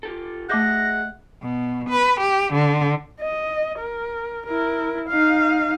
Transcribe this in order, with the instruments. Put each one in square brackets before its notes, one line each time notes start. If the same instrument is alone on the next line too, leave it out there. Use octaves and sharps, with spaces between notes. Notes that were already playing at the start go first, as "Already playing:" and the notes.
[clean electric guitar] F4 G4 A4
[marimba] A3 D6 G6 [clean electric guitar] G#4 D#5 E5 [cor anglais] F#5 [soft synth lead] A#6
[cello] B2
B4
G4
D3
[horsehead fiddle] D#5
A#4
E4 A#4
D#4 F5